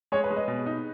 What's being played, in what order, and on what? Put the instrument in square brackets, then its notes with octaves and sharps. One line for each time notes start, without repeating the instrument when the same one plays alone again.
[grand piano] G#3 [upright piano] C#5
[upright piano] B4
[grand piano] G#3
[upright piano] D#5
[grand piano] B2
D#4